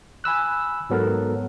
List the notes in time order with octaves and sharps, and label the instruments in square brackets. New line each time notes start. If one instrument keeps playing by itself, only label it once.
[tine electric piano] G#5 B5 E6 F#6
G#2 F#3 B3 A4 A#4